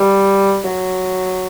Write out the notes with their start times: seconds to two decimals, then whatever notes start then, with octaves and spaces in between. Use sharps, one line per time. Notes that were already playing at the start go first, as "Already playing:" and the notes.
Already playing: G3
0.65 F#3